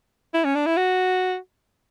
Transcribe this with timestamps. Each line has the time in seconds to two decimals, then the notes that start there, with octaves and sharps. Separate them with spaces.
0.34 E4
0.44 C#4
0.55 D4
0.66 E4
0.77 F#4